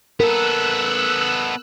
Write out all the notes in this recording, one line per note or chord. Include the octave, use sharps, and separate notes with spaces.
B3 A4 A#4 E6 F#6